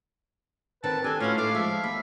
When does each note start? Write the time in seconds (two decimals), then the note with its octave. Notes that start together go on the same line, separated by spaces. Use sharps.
0.84 D3 D#3 C4 B4 A5
1.04 C4 D4 G4 A4 G#5
1.20 A2 C#4 F4 F#4 B4 F5
1.38 A3 D#4 F5 D6
1.55 F3 G#3 E5
1.84 D#2 B5